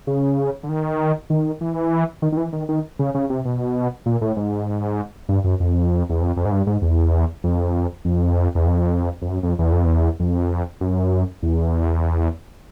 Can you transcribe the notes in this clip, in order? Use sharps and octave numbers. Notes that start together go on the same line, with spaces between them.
C#3
D3
D#3
D#3
E3
D#3
D#3
E3
D#3
D#3
C#3
C#3
C3
B2
A#2
A2
G#2
G2
F#2
F2
E2
F2
F2
G#2
G2
G#2
E2
F2
F2
E2
F2
F2
F#2
F2
E2
F2
E2
F2
F#2
E2